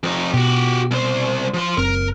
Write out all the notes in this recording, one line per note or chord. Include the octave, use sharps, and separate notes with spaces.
F2 D#4
B2 F#4 G4
C2 C5
F3 C6
F#1 C4 A#4